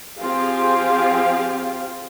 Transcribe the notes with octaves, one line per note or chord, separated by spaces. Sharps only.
F3 C4 F4 G4 G#4 F5